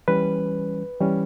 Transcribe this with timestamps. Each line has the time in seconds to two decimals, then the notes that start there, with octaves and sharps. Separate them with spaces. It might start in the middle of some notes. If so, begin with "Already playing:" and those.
0.08 E3 G3 C#4 B4
1.00 E3 G3 C#4